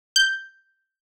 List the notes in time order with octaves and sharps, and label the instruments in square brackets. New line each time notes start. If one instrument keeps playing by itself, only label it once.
[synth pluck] G6